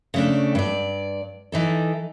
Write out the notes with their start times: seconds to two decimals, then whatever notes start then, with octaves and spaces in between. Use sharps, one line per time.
0.14 C#3 A3 D4
0.55 G2 D5
1.52 E3 D#4 A4